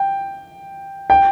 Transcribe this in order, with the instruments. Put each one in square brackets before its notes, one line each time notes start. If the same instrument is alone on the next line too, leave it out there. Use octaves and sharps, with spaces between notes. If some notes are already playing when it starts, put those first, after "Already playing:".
Already playing: [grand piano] G5
G5